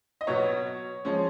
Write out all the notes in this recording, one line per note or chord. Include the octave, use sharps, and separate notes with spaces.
D#5
B2 F#3 B3 C#5
F3 G#3 C#4